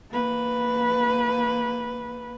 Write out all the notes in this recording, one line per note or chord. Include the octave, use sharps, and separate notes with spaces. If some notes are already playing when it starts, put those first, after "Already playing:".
A#3 B4